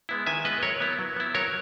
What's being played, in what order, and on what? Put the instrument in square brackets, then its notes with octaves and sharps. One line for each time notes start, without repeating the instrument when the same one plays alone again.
[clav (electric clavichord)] G#3 B3 E4
D#3 E5 G#5
G#3 B3 E4 B4 D#5
F#3 A#4 C#5
B3 E4
F#3
B3 E4
F#3 A#4 C#5